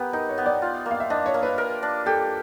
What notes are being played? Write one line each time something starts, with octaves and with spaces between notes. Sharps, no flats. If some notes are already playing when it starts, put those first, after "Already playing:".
Already playing: B3 G4 A#4 B4
D#4 A#4
C#5
B3
D5
F4
A#3
F5
E5
D4 D#5
C#5
A#3
B4
A#4
D4
G4 A4